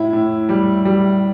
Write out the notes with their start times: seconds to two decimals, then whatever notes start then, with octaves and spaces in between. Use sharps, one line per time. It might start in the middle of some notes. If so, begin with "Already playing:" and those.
Already playing: A2 E4
0.13 A2
0.49 G3
0.85 G3